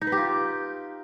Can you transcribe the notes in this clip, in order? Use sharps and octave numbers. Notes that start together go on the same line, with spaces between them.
D#4
B4
G4
F4